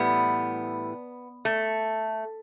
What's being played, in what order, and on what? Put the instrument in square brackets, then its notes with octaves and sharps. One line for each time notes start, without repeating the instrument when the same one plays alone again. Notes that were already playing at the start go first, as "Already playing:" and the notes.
Already playing: [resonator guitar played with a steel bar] A2 E3 G3 B3
A3